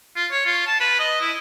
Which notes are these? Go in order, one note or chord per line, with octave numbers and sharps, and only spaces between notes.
F4
C#5
F4
A5
B4
D#5
E4